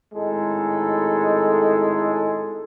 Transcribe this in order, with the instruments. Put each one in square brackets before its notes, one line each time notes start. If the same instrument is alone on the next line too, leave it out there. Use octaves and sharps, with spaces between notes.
[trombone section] G#1 A2 G#3 D#4 A4